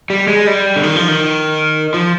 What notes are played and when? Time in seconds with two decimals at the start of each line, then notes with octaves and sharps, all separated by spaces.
0.10 G3
0.28 G#3
0.47 G3
0.76 D3
0.83 D#3
0.96 F3
1.08 D#3
1.94 F3